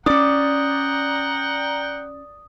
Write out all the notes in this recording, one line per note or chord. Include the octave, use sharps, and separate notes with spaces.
C#4 D4 D5 F#5 G5 A#5 D#6